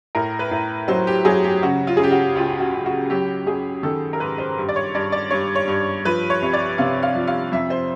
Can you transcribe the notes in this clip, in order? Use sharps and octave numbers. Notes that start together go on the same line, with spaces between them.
A2 A#4
B4
A2
F#3 C5
G4
F#3 G#4
G4
C#3 F#4
F4
G#4
C#3 G4
F#4
C#2 F4
F#4
C#2
F#4
F#3 G4
F#3 G#4
D#3 A4
A#4
G#2 B4
C5
G2
D5
C#5
G2 D5
D5
G2 C#5
C#5
G2
F3 B4
C#5
C2
D5
C3 F5
F5
F3
F5
F2 E5
C5